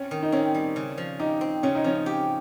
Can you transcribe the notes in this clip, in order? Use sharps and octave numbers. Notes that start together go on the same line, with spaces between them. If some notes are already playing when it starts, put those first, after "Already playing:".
Already playing: C4 C#4
D#3
D#4
C4 C#4
G3
C#3
F3
D#4 G4
C4
C#3 C#4
D#4
F3 C#4
G4